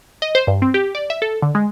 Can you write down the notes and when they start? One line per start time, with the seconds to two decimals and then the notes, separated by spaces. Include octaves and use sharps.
0.22 D#5
0.35 C5
0.47 G2
0.62 C4
0.74 G4
0.95 D5
1.10 E5
1.22 A4
1.42 D3
1.55 G#3